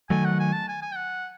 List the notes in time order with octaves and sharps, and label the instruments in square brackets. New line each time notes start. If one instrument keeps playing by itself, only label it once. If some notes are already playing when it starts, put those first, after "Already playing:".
[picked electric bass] D#3 F#3 A3 [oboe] G#5
[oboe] F#5
G#5
A5
G#5
G#5
G5
F#5